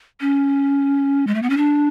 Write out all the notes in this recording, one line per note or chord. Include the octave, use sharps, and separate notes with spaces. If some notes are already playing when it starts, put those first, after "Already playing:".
C#4
G#3
A3
B3
C#4
D4